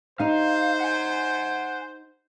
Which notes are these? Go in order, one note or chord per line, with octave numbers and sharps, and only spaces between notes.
D#4 G4 C5 F5
F#5 G#5